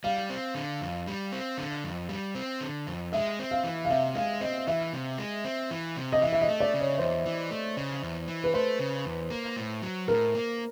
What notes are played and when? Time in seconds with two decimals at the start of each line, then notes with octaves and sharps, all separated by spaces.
0.04 G3 F5
0.30 C4
0.55 D3
0.82 F2
1.07 G3
1.32 C4
1.58 D3
1.84 F2
2.09 G3
2.35 C4
2.61 D3
2.87 F2
3.13 G#3 E5
3.39 C4
3.51 F5
3.64 E3
3.85 F5
3.89 C3 E5
4.15 G#3 F5
4.41 C4 D#5
4.67 E3 E5
4.93 C3
5.18 G#3
5.45 C4
5.71 E3
5.97 C3
6.13 D#5
6.22 E3 E5
6.32 E5
6.41 D#5
6.48 A3
6.60 D5
6.74 C#3
6.80 C#5
6.99 E2 C5
7.26 E3
7.51 A3
7.77 C#3
8.03 E2
8.28 E3
8.44 B4
8.54 A3 C5
8.80 C#3
9.05 E2
9.30 A#3
9.56 A2
9.82 F#3
10.08 A2 A#4
10.35 A#3